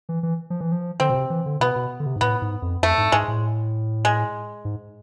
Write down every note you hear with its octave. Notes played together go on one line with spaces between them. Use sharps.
E3
E3
F3
E3
F3
D3 C4
B2
C3
E3
D3
B2 B3
B2
D3
C3
G#2
A2 B3
G#2
F2
F2 A3
G#2
G#2 G#3
A2
G#3
G#2